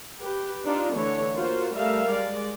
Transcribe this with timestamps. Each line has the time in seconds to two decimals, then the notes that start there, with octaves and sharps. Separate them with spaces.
0.21 G4 B4
0.65 D4 D#4 F4
0.95 D3 E3 A3 C#5
1.34 A#3 F4 F#4 C5
1.74 G3 A3 A#4 E5 F5
2.11 G#3 D5